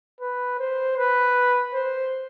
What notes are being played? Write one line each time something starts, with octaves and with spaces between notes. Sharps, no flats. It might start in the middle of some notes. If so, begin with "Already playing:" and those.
B4
C5
B4
C5